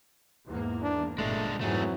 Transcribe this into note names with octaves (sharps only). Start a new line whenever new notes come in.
E2 G#2 A#3
D4
G1 A#2 G#3 A3 D4
F2 G#2 E3 F#3 A3 G#4